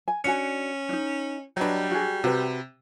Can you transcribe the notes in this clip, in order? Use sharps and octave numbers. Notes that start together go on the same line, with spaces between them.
G#5
C#4 D4 F#4 G#5 C#7
D4 D#4
F#3 G3 D4 B4 D#5
F#4 G#4
C3 F#4 B4